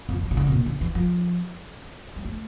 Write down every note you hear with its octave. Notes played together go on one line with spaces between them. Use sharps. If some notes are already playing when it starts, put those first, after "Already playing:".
F2
E3
C3
D3
C3
A#2
D3
E3
F3
G3
A3